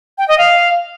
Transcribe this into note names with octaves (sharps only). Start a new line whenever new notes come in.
G5
D#5
F5